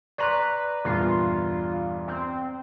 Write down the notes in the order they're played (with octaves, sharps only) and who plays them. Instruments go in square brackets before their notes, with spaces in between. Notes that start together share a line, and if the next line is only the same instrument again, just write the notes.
[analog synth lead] B4 [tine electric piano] D5 A#5 F#6 [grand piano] C6 C#6
[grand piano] E2 G2 A#2 [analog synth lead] F4
[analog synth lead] C4